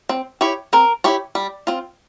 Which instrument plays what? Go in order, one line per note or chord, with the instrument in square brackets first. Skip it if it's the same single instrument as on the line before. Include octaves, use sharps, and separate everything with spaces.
[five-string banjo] C4
E4 G4 C#5
[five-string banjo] C4 [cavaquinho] A#4
[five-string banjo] E4 G4 C#5
G3
C4 F4